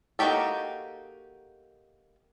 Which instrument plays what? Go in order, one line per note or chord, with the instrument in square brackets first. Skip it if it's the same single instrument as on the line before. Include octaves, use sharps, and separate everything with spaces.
[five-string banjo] A#3 D#4 F#4 G4 A4